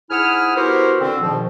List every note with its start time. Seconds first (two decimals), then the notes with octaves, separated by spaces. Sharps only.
0.11 G#2 E4 F#5 G#5 D#6 F6
0.56 B3 E4 F#4 G4 A#4 C5
1.01 D3 C4
1.21 G#2 B2 D#3 F3